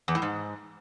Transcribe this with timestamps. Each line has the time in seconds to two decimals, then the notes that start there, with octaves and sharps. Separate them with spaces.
0.08 E2
0.15 A2
0.22 G#2